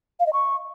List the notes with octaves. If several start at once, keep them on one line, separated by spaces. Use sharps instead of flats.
F5
D#5
C#6